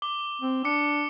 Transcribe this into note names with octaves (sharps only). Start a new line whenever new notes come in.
D6 G7
C4
D4 D6 C#7